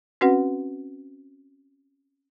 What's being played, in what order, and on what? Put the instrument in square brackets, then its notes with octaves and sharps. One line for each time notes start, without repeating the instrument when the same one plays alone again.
[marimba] C4 C#4 F#4 B4 F#5